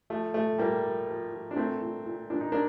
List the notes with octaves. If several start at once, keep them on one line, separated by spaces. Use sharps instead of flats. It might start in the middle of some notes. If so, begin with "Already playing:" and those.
F3 A3
F3 A3
A#2 G3 A#3
F3
F3
F3
D4
A#2 A3 C4
A#2
A#2
A#2 D4
D#4
A#3 D4